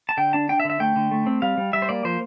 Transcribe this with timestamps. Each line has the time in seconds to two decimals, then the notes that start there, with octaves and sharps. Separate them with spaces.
0.09 A5
0.17 D3 G5
0.33 D4 A5
0.49 D4 G5
0.60 E5
0.64 D3
0.70 E5
0.80 A3 G5
0.96 D3
1.11 A3
1.26 C4
1.42 G3 F5
1.57 G3
1.73 G3 E5
1.82 C5
1.89 A#3 D5
2.05 F3 C5